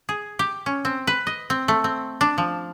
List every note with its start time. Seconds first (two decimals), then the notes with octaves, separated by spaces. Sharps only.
0.09 G#4
0.39 G4
0.66 C#4
0.85 C4
1.07 B4
1.27 D#5
1.50 C4
1.68 A3
1.84 C4
2.21 D4
2.38 F3